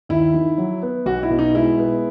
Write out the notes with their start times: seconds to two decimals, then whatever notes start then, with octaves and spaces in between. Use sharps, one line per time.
0.09 D#2 E4
0.34 D#3
0.58 F#3
0.83 B3
1.06 B1 F#4
1.23 E4
1.30 B2
1.39 D#4
1.54 G#3 E4
1.79 B3